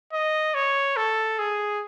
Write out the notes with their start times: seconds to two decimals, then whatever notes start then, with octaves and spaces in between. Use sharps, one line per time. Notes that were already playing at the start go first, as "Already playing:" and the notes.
0.13 D#5
0.54 C#5
0.96 A4
1.39 G#4